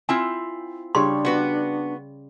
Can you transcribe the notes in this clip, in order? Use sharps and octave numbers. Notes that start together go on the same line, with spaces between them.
C4 E4 F4 G#5
C#3 G3 D4 C#5 C6
B3 F#4 B4